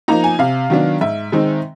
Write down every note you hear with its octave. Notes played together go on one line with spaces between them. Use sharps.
F3 A#3 D#4 A#5
G#5
C3 F5
D#3 F#3 B3 D4
G#2 E5
D#3 G#3 C4 D#4